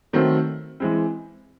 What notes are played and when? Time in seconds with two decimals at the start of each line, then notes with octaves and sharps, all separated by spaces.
0.13 D#3 F#3 A3 C4
0.80 E3 G#3 C4